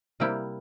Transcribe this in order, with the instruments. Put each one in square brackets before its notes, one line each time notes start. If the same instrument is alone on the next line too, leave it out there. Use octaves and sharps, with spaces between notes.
[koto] C3 G3 A#3 E4 G4